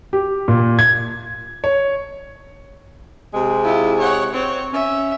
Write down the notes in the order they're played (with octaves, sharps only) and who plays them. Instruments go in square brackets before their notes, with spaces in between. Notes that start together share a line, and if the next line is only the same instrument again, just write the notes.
[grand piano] G4
A#2
G#6
C#5
[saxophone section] C3 G#3 G#4
[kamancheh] E4 F4
C#5 F#5
C4 C#5
[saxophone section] C#4 [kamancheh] E5